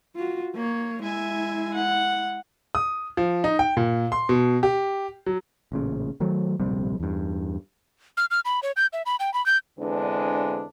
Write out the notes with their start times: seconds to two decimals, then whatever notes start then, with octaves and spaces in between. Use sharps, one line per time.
0.16 F4 F#4
0.55 A#3 C#5
1.03 G#3 E4 E5 G#5
1.74 F#5
2.75 D#6
3.17 F3
3.44 D#4
3.59 G5
3.77 A#2
4.12 C6
4.29 B2
4.63 G4
5.26 F#3
5.72 A1 A#2 C#3
6.20 D#3 F#3 A3
6.59 D1 A#1 C3 G3
7.00 E2 G2
8.17 F6
8.31 F6
8.45 B5
8.63 C#5
8.77 G6
8.93 E5
9.06 B5
9.20 G5
9.34 B5
9.46 G6
9.79 E2 D3 G#3 C4 D4 B4